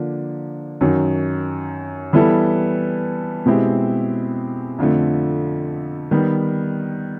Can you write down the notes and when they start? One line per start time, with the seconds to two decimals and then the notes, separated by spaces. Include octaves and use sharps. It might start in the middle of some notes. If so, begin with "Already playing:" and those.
Already playing: D3 F3 A#3 D4
0.81 F#2 D#3 F#3
2.13 E3 G3 B3 E4 A4
3.46 B2 G#3 C4 E4 G4
4.78 F2 D3 F3 A3
6.11 D#3 G3 B3